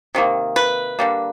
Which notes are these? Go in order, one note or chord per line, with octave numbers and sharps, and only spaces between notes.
C3 D#3 A#3
B4
D3 G3 A#3